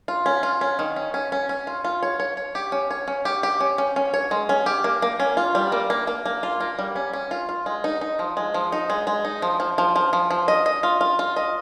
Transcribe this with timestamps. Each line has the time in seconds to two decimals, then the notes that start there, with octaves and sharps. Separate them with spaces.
0.08 F4
0.26 C#4
0.43 F4
0.61 C#4
0.79 D#3
0.96 C#4
1.14 C#4
1.32 C#4
1.49 C#4
1.67 F4
1.84 F4
2.03 C#5
2.20 C#5
2.37 C#5
2.55 G4
2.72 C#4
2.91 C#5
3.08 C#4
3.25 G4
3.43 G4
3.60 C#4
3.78 C#4
3.96 C#4
4.14 C#5
4.31 G#3
4.49 C#4
4.66 G4
4.84 A#3
5.02 A#3
5.20 C#4
5.37 F4
5.55 G3
5.72 A#3
5.90 A#3
6.07 A#3
6.25 A#3
6.43 F4
6.60 A#3
6.79 G3
6.96 C#4
7.13 C#4
7.31 F4
7.49 F4
7.66 G#3
7.84 D#4
8.01 D#4
8.19 F3
8.37 G#3
8.54 F3
8.72 D#4
8.90 G#3
9.07 G#3
9.25 D#4
9.42 F3
9.60 F3
9.78 F3
9.96 F3
10.13 F3
10.31 F3
10.48 D#5
10.66 D#5
10.83 F4
11.01 F4
11.19 F4
11.36 D#5